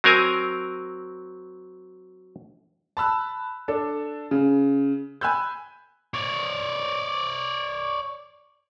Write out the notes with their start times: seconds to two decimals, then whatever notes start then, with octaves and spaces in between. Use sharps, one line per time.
0.04 F#3 C4 A#4 G#5
2.97 A5 B5 E6 F#6
3.68 D4 A4
4.31 C#3
5.21 G#5 B5 E6 F#6 G6
6.14 C#5 D5